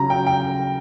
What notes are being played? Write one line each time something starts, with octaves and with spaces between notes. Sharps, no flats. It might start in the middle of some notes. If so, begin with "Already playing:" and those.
Already playing: C#3 F#3 C#4 A#5
G5
G5